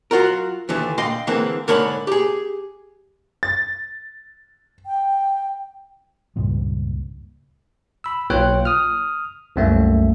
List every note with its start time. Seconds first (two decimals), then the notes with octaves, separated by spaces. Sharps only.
0.11 F#3 F4 F#4 A#4
0.69 D#2 D3 E3
0.98 A#2 D#5 F5 G5 C6
1.27 D3 E3 G#3 A#3 C4
1.68 G#2 D3 A#4 C#5 D5 B5
2.07 G4 G#4
3.43 A6
4.86 G5
6.36 C#2 G2 A#2
8.04 B5 E6
8.30 B1 A#3 F4 C#5 G5 F#6
8.65 D#6 F6
9.56 C2 F#2 A3 A#3 E5